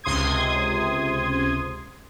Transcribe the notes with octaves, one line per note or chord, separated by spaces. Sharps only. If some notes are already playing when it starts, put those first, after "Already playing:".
C#2 C3 C6 D#6 G#6